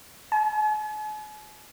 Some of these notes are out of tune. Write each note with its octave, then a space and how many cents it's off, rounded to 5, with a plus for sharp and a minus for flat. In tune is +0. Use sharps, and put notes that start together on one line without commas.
G#5 +45